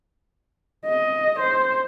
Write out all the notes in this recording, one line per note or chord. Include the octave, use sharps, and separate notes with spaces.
D#5
C5